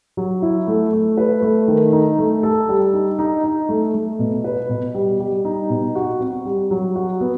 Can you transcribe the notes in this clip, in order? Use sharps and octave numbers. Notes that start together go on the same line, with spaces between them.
F#3
E4
A3
A3
B4
A3
D#3
D#4
A3
A4
G3
D#4
D#4
D#4
A3
A3
B2
B4
B2
G3
G3
D#4
B2
F#4
C4
G3
F#3
F#4
B3